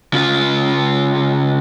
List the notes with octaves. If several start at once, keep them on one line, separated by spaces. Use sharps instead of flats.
C#3 F4